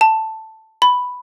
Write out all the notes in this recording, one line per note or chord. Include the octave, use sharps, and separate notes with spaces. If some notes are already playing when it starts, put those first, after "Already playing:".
A5
B5